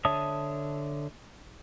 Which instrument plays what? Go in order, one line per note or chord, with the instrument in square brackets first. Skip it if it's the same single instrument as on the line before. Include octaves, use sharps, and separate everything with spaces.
[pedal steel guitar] D3 C#5 E5 A5 D#6